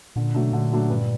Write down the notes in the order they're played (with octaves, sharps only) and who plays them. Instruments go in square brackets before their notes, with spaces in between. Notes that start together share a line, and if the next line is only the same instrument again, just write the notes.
[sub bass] A#2 [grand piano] D3
[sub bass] B2 [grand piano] F#3 A3 D4
[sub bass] A#2 [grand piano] D3
[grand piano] F#3 A3 D4
G2